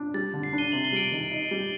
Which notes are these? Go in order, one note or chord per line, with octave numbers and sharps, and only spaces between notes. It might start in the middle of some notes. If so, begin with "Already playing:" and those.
Already playing: D4
G3 A6
D3
C7
D4
D#7 G7
C3 F#7
G7
G3 D7 F#7
D#3
D#4
G3